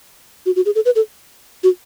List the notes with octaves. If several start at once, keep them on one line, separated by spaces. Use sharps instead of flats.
F#4
F#4
G#4
A4
B4
A4
F#4